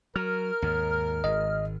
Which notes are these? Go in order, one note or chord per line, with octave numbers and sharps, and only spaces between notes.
F#3 A#4 F6
D#2 G#2
G#1 D#5